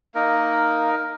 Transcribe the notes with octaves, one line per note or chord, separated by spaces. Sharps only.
A#3 D#4 A#4